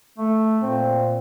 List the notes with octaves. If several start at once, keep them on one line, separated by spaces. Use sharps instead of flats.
A3
A#2 C4